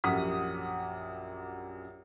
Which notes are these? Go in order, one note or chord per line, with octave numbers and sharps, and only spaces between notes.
A#1 F#2 G4 F#5 D#6 B6